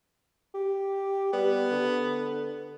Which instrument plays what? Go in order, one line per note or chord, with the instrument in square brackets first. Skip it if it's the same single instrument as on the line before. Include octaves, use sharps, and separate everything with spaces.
[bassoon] G4
[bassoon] G3 [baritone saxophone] B3
[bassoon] D3